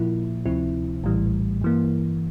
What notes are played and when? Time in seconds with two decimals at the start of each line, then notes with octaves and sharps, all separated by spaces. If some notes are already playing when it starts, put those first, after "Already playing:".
Already playing: A#2 F3 A#3 E4
0.46 D2 C3 F3 C4 E4
1.03 A#1 A2 E3 G3
1.62 G2 E3 A#3